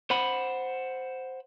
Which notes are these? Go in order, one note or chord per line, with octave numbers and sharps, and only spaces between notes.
C5 F#5 B5